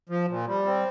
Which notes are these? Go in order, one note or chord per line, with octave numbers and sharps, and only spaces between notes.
F3
A#2
G3
C4